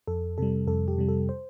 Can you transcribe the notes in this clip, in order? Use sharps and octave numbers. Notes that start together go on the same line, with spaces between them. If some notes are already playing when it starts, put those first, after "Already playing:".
F2 A4
C3 G3 A4
F2 A4
G4
C3 G3
A4
C5